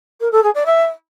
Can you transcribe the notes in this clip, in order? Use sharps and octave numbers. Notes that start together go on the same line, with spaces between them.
A#4
A4
G#4
D5
E5